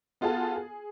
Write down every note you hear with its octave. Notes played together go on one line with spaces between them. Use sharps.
B3 F4 F#4 G#4 A4
G#4